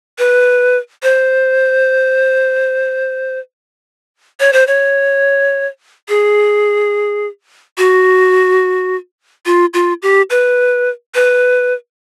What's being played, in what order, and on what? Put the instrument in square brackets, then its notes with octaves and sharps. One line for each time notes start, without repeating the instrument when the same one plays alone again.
[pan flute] B4
C5
C#5
C5
C#5
G#4
F#4
F4
F4
G4
B4
B4